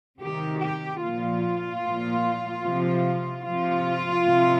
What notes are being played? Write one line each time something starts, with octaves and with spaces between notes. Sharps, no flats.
C3 D#3 G4
G4
A#2 F3 F4
A#2 F3
C3 F3
C3 F3 F4
C3 F3